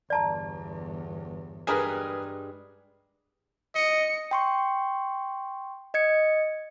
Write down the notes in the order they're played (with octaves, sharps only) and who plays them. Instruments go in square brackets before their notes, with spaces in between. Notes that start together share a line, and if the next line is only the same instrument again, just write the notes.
[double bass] G1 E2 [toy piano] D5 A5 A#5
[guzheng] G2 G3 G#3 [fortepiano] G#4 A#4 B4
[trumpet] D#5 [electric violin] C#7
[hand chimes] G5 C6 C#6
D#5 G#6 C#7